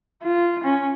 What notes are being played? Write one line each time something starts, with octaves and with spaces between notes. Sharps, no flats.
F4
C#4